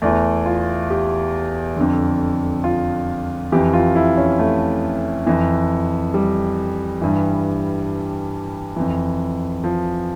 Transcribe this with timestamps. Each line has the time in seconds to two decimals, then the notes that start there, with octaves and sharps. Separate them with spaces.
0.02 E2 E3 A3
0.46 F4
0.90 G4
1.76 F2 D3
2.64 F4
3.52 F2 E3 G4
3.74 F4
3.96 E4
4.17 C#4
4.39 A3
5.26 F2 E3
6.14 G3
7.01 G2 E3
8.76 F2 E3
9.64 F3